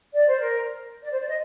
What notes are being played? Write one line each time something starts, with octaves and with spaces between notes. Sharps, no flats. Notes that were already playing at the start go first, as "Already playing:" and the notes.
D5
C5
A#4
D5
C5
D5
D#5